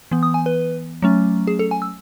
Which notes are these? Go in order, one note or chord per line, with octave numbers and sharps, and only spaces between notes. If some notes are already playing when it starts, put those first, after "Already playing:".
E3 B3
D#6
G#5
B4
F#3 A3 C#4
G#4
A4
G#5
E6